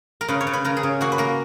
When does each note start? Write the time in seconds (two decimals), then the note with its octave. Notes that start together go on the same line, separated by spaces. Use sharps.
0.21 A#4
0.28 C#3 B4
0.41 C#5
0.47 C#3
0.53 B4
0.65 C#3 A#4
0.77 G#4
0.83 C#3
1.01 A#3 F#4
1.12 B4
1.18 A#3 A#4